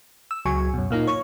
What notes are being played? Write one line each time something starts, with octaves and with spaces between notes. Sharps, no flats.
E6
C#2 F#3 G#5 C#6
F#2 B2
A#2 A#3 D#4 F4
C#5 C#6